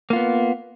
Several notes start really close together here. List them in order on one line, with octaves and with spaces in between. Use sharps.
A#3 F4 B3